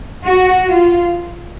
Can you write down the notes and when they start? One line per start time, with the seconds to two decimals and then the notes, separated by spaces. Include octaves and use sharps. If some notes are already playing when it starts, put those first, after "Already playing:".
0.25 F#4
0.68 F4